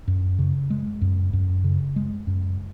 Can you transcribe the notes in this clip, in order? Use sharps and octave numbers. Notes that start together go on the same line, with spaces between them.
F#2
C#3
G#3
F#2
F#2
C#3
G#3
F#2